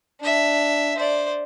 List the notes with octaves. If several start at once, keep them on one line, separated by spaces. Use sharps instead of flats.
D4 E5
C5 D5